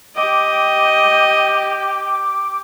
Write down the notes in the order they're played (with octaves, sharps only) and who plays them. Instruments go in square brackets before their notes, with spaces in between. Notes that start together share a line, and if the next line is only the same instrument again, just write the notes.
[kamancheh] G4 G5 [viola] D#5 [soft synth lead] D6